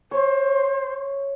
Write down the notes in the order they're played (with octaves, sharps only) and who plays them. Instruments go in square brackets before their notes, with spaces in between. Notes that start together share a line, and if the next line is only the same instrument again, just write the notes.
[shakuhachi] C5 [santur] C#5